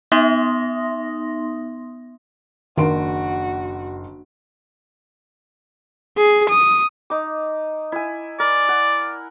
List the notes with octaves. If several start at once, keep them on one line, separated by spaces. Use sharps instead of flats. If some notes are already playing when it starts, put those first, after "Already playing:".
B3 D#4 E5 C6 D#6 A#6
F#1 D#3 D4 F#4 C6 D7
G#4
D#6
D#4 D6
E4 G#5
A#4 D5
F#5